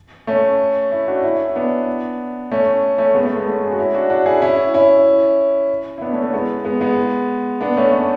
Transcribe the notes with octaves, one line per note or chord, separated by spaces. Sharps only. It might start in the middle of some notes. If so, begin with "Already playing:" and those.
A3 C#4
C#4 E4
D4 F#4
C#4 E4
B3 D4
A3 C#4
A3 C#4
G#3 B3
A3
G#3 B3
A3 C#4
G#4
F#4
C#4 E4
D4 F#4
D4 F#4
E4 G#4
C#4 E4
C#4 E4
E4
B3 D4
A3 C#4
A3 C#4
G#3 B3
G#3 B3
G#3 B3
B3 D4
A3 C#4
A3 C#4